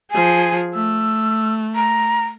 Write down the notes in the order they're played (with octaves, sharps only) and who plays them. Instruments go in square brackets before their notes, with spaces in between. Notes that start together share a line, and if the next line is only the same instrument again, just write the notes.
[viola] F3 G#4 [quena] G#5
[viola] A3 [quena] E6
[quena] A#5